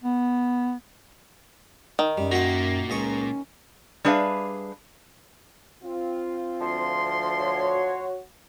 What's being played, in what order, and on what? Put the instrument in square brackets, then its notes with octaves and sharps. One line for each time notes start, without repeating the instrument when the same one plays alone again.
[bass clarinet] B3
[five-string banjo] D#3
[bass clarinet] F#2 [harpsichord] G3
[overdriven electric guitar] A#2 A#3 [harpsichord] F#4 G5
[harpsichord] C#2 D#5 C#6 [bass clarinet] C#4
[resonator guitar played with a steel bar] G3 D4 G#4 B4 E5 F5
[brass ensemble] C4 F4
[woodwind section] D2 F3 C6
[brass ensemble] F#4 C#5